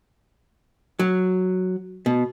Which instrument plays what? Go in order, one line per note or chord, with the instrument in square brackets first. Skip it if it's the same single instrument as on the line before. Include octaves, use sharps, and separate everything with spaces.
[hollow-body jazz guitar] F#3
B2